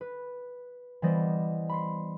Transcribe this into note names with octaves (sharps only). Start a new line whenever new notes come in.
B4
E3 G3 B3 C5 D5 D#5
B5 C6 C7